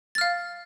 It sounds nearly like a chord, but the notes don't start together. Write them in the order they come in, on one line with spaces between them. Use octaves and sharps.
A6 F6 F5